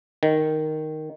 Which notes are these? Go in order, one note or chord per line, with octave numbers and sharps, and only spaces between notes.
D#3